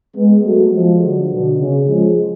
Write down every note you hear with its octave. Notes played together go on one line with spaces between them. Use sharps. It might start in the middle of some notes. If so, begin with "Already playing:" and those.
G#3 B3
F#3 A3
F3 G#3
D3 F#3
B2 D3
C#3
F3 G#3